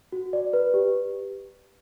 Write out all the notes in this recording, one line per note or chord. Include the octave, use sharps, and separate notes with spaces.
F#4
D5
B4
G4